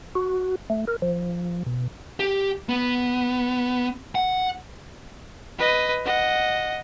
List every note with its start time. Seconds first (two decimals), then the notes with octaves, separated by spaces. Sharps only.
0.15 F#4
0.70 A3
0.87 A#4
1.02 F3
1.66 B2
2.20 G4
2.69 B3
4.15 F#5
5.58 B4 D#5
6.05 D#5 F#5